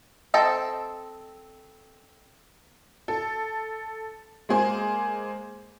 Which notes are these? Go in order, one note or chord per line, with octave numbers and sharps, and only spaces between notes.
C4 A4 D#5 G5 A5
A4
G#3 A#3 G#4 C5